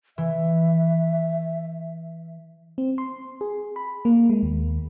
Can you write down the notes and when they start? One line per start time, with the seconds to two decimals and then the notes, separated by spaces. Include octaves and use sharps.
0.18 E3 E5
2.78 C4
2.98 C6
3.41 G#4
3.76 B5
4.05 A#3
4.29 G#3
4.43 D#2